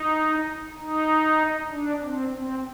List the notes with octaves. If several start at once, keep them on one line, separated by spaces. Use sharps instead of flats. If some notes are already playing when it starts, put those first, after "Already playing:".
Already playing: D#4
D#4
D4
C4
C4